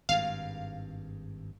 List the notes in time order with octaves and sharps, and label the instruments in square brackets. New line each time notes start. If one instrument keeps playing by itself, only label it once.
[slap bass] G#1 G2 [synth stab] F5